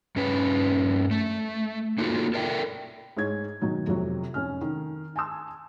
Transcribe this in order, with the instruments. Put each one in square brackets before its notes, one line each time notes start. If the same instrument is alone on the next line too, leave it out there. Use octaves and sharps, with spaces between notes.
[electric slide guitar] G2 C#4 B4
A3
A#3 D#4 F4 F#4 A4
A4 A#4 D5 E5 F5 G5
[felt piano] G#2 C#5 G#6
B2 D#3 F#3 D#4
F2 C3 F#3
F1 C#4 F6
D#3
G#5 A5 C6 E6